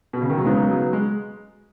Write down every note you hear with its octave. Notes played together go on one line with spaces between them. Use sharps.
B2
C#3
D#3
F#3
C#3 G#3 B3 D#4
F#3
G#3